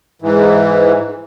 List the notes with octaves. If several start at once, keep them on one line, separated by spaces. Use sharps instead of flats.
G#2 E3